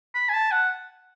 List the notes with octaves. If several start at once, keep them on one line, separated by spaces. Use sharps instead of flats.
B5
G#5
A5
F#5